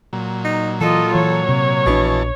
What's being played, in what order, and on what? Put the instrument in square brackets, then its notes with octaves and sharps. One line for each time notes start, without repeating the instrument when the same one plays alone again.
[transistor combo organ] A#2 F#3
[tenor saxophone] D#4
[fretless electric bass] E3 [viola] F4 D#5 [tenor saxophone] A4
[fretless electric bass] E3 [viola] C#5
[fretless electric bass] C3
[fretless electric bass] A#1 D4 [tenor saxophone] B2 [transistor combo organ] E3 A5